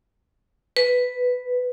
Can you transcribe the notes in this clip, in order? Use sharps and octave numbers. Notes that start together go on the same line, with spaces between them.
B4